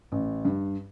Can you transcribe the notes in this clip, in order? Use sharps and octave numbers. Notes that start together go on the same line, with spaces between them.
A1
G2